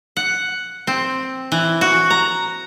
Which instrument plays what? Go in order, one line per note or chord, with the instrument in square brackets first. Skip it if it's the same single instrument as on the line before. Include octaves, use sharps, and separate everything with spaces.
[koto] F#5
C4
E3
F#4
A#5